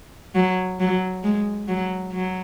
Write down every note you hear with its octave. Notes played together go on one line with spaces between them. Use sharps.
F#3
F#3
G#3
F#3
F#3